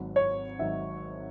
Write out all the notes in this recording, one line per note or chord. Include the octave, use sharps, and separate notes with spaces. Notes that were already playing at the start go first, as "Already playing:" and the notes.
Already playing: G#1 G#2 F#3
C#5
G#1 G#2 F#3 E5